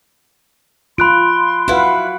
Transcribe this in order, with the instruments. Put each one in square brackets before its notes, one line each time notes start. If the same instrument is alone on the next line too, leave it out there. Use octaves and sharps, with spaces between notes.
[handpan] F4 [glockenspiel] B5 F#6 D7 [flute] C6
[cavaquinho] E4 B4 [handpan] F#4 F5 F#5